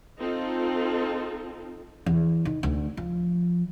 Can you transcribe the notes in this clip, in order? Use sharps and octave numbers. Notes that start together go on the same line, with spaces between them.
C4 D#4 F4 A4
E2
D#3
D2
F3